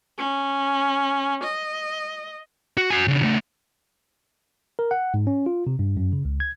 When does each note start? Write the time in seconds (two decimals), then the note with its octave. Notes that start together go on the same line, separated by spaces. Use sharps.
0.18 C#4
1.43 D#5
2.77 F#4
2.90 F#4 G#5
3.08 C#3 D4
3.22 C#3 A3
4.79 A#4
4.91 F#5
5.14 G#2
5.27 C#4
5.46 F4
5.67 C3
5.79 G2
5.97 F#2
6.13 C#3
6.25 C#2
6.40 G#6